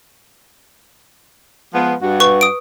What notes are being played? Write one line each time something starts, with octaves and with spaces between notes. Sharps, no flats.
F3 G#3 B3
G2 F#4
B4 C#6
D#6 D7